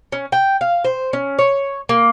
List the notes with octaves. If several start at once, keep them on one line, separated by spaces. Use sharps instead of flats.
C#4
G5
F5
C5
C#4
C#5
A#3